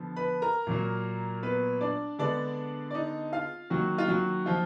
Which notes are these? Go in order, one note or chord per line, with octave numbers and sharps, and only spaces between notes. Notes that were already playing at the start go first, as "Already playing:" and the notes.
Already playing: D3 F3 B3
B4 B5
A#4 A#5
A#2 F#3 A#3
B3 B4
D4 D5
D3 G#3 B3 D4 D5
D5
D#4 D#5
F4 F5
D#3 F#3 A#3 F#4
F4
F#3 F#4
F3 F4